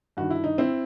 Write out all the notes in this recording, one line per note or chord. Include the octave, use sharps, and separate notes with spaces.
G2 D#3 F#4
E4
D#4
C4 E4